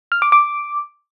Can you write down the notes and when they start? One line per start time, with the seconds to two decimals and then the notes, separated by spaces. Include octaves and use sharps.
0.12 F6
0.22 D6
0.32 D6